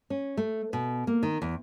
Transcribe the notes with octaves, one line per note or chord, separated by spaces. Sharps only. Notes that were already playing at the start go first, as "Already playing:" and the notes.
C#4
A3
B2
A#3
D#3
E2